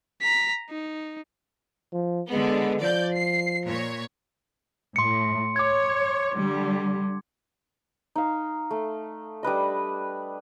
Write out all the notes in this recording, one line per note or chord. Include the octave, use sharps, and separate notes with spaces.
A#5 B6
D#4
F3
D3 G#3 B3
F3 D5 G6
C7
A#2 C#5
A2 C6 C#7
C#5 D6 G#6
D3 G3
D#4 F5
A3
G3 D4 B4 D#5